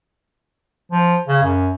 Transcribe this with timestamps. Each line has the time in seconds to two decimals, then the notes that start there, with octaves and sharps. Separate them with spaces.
0.92 F3
1.28 C#3
1.43 F#2